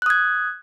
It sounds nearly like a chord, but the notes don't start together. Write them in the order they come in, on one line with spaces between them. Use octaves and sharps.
F#6 D#6 G#6